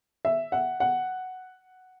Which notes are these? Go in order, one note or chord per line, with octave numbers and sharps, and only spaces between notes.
E5
F#5
F#5